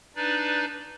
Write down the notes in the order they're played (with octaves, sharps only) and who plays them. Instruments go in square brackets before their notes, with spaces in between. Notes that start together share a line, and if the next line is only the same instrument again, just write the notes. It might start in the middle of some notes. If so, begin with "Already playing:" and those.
[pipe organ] D4 D#4 B4 D5